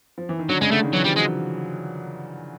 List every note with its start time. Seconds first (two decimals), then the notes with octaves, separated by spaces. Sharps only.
0.18 F3
0.29 E3
0.39 D#3
0.49 D3 F#3
0.61 C#3 G#3
0.72 D3 A3
0.83 D#3
0.94 E3 F#3
1.05 F3 G3
1.16 F#3 G#3